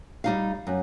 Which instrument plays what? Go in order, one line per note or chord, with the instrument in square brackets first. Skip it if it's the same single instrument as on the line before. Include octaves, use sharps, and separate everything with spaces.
[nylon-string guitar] G3 D#4 F5
F#2